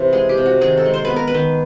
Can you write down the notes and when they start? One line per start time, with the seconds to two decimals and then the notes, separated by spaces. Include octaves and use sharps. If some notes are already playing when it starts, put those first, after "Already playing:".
Already playing: C3 E3
0.12 G#3 G#4
0.29 G4
0.37 C3
0.46 F#4
0.61 D#3 G#4
0.77 A4
0.85 G#3
0.94 C5
1.05 B4
1.10 B3
1.16 A#4
1.27 B4
1.34 D#3